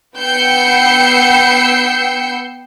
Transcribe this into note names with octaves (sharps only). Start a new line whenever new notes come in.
B3 G5 E6 G6 C7 C#7